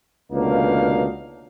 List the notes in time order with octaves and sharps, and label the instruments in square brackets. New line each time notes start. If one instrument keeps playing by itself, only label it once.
[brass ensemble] C#2 B2 D3 A#3 D#4 F5